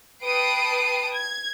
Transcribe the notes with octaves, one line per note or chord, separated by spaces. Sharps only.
B4 G5 A5 D#6 C7 D7
G#6